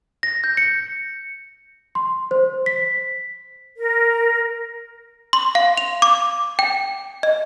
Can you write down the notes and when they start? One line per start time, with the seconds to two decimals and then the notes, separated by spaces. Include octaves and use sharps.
0.23 A#6
0.44 G6
0.57 C#7
1.95 C6
2.31 C5
2.66 B6
3.77 A#4
5.33 C6
5.55 F5
5.77 F7
6.02 D6
6.59 G5
7.23 D#5